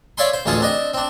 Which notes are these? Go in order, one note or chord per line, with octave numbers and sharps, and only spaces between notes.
C#5 D5 E5 F5 G#5 C6
C5
A1 D2 G#3 F4 G#4 A4
C4 D4 D#5
C4 D4